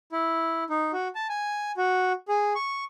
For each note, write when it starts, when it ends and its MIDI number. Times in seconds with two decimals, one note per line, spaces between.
0.12 0.64 64
0.70 0.92 63
0.93 1.08 66
1.15 1.27 81
1.29 1.72 80
1.77 2.13 66
2.28 2.53 68
2.55 2.84 85